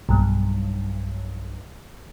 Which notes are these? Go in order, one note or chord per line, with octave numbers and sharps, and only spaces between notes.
B1 G2